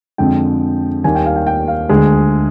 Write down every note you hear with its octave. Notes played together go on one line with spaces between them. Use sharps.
F2 D3 G#3 G5
D#2 D#3 G3 G#5
G5
F5
G5
G5
F5
D2 D3 G#3 G#4